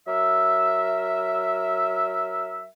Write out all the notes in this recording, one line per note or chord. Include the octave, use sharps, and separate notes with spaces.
F#3 A#4 E5